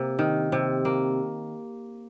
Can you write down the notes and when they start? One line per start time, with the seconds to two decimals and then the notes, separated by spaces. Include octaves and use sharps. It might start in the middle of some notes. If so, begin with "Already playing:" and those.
Already playing: C3 A#3
0.19 D#3
0.52 C3
0.85 A#3